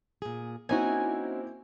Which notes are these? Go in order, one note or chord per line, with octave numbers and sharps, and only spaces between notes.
A#2 G#4
A#3 C4 C#4 D#4 E4 F#4 G#5